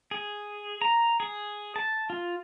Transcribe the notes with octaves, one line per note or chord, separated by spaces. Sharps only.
G#4
A#5
G#4
A5
F4